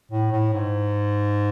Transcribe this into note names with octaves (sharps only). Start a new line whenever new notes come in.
A2
A2
G#2